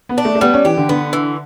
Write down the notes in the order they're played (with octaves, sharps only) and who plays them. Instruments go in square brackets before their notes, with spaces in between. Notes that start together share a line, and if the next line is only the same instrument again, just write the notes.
[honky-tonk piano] B3
[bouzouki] D4
[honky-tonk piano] A3
A3
[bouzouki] G3 [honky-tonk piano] B3
[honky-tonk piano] C#4
[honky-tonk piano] E3 [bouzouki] G4
[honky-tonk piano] D3
[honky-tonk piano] D3 [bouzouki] B3
[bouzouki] E3